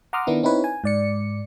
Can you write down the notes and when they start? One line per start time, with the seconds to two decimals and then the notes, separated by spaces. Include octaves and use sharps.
0.13 F#5 A#5 C6 D6 D#6 F6
0.27 D#3 B3 D4 E4
0.43 C4 D#4 E4 B4 C#5
0.64 G#5
0.84 G#2 D5 C#7